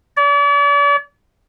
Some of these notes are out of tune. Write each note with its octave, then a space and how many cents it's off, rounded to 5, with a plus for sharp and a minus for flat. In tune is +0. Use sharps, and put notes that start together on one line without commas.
D5 -40